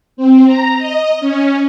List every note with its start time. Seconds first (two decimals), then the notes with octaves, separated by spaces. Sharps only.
0.17 C4
0.47 A#5
0.78 D#5
1.20 C#4